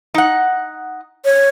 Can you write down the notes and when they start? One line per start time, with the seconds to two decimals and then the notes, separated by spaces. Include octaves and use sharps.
0.14 D#4 F#5
1.25 C#5